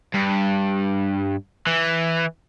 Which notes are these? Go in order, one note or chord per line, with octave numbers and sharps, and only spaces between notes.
G2
E3